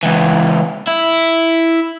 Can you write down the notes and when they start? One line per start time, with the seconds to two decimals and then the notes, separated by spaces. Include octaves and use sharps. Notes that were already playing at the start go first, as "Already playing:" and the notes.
0.03 C#2 E3
0.87 E4